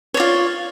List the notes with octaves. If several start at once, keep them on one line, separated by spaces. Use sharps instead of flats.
F4 C#5 D5